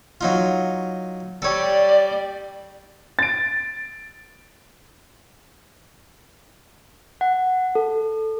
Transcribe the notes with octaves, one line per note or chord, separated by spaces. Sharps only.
F#3 D#4 F4
G3 A4 C#5 D5
A6 D7
F#5
A4